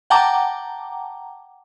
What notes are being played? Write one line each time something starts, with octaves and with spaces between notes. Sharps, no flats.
F#5 G5 A5 A#5 D6